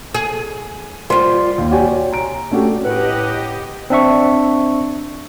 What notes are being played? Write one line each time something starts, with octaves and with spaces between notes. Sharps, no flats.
G#4
G3 F4 C5
D#2
F#4 G4 C#5 D5 G#5
C#5
A#5 D7
A3 C#4 D4 F#4 G4 A4
A2 G4 B4 D#5 F#5
C4 D4 E5 C#6